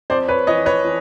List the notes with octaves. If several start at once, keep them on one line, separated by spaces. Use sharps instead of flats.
F2 C5 D5
B4 C#5
E3 C#5 D#5
B4 C#5
E3